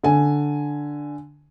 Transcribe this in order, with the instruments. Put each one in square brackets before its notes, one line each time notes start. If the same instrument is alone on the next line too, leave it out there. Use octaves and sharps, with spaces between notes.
[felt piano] D3 G#5